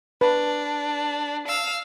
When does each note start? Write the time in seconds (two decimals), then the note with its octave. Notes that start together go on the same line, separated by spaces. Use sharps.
0.21 D4 B4
1.47 F5 E6